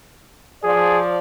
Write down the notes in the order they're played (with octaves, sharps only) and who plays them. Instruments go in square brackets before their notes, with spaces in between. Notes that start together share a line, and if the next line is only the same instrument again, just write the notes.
[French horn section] F3 D5 [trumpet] G#4